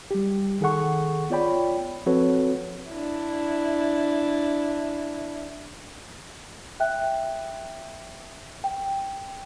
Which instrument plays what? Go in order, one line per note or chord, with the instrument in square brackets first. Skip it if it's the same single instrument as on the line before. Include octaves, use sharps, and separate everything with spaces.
[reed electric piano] G3 G4
C2 D#3 G#4 A4 F#5 C#6
B3 F4 C#5 D5 G5 B5
F3 C4 F#4 A4 B4 C#5
[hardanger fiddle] D4 E4
[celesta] E5 G5 F#6
G5